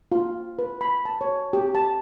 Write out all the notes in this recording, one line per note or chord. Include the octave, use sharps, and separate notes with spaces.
F4
B4
B5
A5
C#5
G4
A5